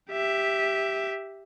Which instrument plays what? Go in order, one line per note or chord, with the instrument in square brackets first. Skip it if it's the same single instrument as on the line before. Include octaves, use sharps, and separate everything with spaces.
[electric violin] G4 E5